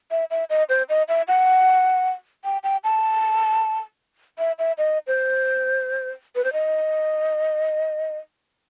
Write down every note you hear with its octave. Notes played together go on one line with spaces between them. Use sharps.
E5
E5
D#5
C5
D#5
E5
F#5
G5
G5
A5
E5
E5
D#5
C5
B4
C5
D#5